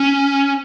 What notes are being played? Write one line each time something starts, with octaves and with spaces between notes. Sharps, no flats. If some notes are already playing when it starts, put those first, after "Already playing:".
Already playing: C#4